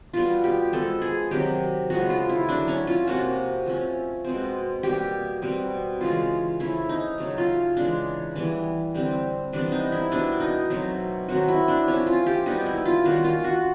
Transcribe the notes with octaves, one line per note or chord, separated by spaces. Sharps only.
B2 G3 B3 F4
G4
F3 G#3 B3 A4
G#4
C3 D#3 F#3 G4
C#3 F3 G#3 B3 F#4
F4
E4
D3 F#3 A3 D4
C#4
F4
C3 F3 A#3 C#4 F#4
F3 A3 C#4
B2 G#3 C4
B2 G3 A#3 G4
B2 G3 C4
C#3 E3 G#3 C#4 F4
F3 A3 C#4 E4
D#4
C#3 F#3 A3 C#4
F4
C#3 E3 G#3 D4
E3 G3 B3
D3 G3 C4
C3 E3 G3 B3 D4
D#4
E4
B2 G3 B3 D4
D#4
B2 F#3 A3 C4
D#3 F#3 A3 C4 F#4
E4
D4
F3 A3 C4 C#4
F4
G4
B2 G3 B3 D#4
E4
F4
D#3 G3 A#3 C#4 F#4
F4
F#4